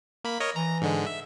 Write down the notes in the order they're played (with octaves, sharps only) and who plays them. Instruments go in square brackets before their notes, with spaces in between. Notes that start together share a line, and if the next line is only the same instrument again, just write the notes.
[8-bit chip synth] A#3 B5
A#4 C#5 D#5
[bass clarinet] E3 [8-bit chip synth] A#5
[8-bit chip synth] G#2 D3 G#3
E5